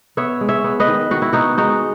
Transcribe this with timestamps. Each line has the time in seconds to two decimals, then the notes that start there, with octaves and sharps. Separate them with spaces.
0.17 B3 C#5 E5
0.41 G#3
0.49 C#5 E5
0.64 B3
0.80 B4 D#5
0.87 D#3
1.11 D#3 F#4
1.22 E4
1.33 B3 D#4 F#4
1.58 G#3 D#4 F#4